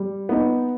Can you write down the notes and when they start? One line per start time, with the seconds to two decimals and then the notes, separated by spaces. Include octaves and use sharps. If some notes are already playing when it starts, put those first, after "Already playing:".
Already playing: G3
0.29 B3 D#4